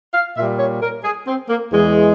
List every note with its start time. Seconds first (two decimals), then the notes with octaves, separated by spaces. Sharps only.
0.14 F5
0.36 A#2 G3 E5
0.59 C#5
0.82 A#4
1.04 G#4
1.27 C4
1.50 A#3
1.72 E2 E3 G#3